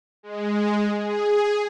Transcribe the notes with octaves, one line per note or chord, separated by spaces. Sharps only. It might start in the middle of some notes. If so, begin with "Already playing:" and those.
G#3
G#4